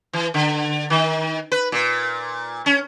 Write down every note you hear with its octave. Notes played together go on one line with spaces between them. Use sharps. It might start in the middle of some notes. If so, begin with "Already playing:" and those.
E3
D3
D#3
B4
A#2
C#4